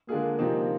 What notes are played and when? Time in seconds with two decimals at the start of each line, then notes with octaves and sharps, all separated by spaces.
0.09 D3 G#3 A#3 D4 F4 G#4
0.39 C3 F3 C4 D#4